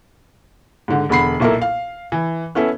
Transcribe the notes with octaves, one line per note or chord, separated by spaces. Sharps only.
G#2 D3
E1 D3 B5 C7
B1 A#2 E4 A4 A#4
F5
E3
B3 C#4 E4 A4